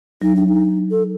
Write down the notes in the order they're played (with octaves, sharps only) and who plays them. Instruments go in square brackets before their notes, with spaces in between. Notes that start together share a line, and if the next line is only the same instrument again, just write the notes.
[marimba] F#3 [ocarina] D#4
[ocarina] D4
D#4
A4